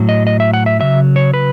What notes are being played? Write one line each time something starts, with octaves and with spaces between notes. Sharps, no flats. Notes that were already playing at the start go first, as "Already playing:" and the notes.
Already playing: A2 F#3
D#5
D#5
E5
F#5
E5
C#3 F#3 E5
C#5
B4